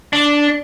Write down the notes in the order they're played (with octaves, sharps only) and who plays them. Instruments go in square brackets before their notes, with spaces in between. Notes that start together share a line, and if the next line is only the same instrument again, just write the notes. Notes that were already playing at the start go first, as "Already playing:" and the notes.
[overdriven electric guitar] D4